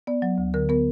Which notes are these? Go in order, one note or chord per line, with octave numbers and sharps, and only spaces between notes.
B3 D5
F#3
D2
D3 A#4
B3 A#4